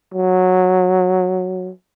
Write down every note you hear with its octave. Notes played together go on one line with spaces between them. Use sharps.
F#3